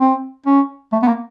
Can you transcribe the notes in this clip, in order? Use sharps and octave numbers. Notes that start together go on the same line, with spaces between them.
C4
C#4
A3
B3
A#3